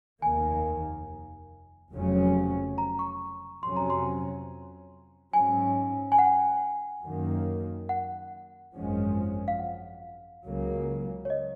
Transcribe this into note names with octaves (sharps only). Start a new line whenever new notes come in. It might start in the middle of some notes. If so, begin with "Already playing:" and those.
F1 D#2 D#3 A#3 G#5
F1 F2 C#3 F#3 C#4
A#5
C#6
F2 C3 F#3 C#4 C6
A#5
C6
G#2 F#3 C#4 G#5
G#5
F#5
F#2 D#3 A#3
F#5
G#1 F#2 F3 G#3 C#4
F5
F#5
C#2 C#3 F#3 A#3
C#5
D#5